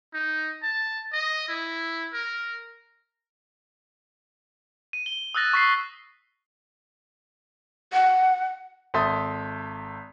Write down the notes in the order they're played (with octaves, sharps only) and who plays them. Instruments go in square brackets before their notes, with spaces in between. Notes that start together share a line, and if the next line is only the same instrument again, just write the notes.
[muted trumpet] D#4
A5
D#5
E4
A#4
[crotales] D#7
G7
D#6 E6 F#6 A6 A#6
C#6 B6 C7
[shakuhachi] F#5
[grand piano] G#1 A4 E5 C6 D#6 A6